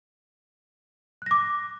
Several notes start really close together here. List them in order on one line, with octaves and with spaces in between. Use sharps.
F#6 A#6 D6